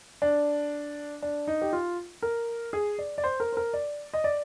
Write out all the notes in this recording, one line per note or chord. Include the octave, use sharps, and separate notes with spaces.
D4
D4
D#4
G4
F4
A#4
G#4
D5
D5
C5
A#4
C5
A#4
D5
D#5
D5